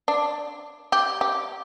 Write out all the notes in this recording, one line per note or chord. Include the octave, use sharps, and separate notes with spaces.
D4
G4
G4